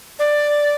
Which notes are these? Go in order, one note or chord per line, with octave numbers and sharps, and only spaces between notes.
D5